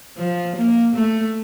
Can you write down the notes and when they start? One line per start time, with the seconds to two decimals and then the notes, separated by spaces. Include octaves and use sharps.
0.17 F3
0.56 A#3
0.96 A3